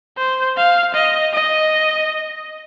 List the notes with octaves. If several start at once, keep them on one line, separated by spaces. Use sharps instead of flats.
C5
F5
D#5
D#5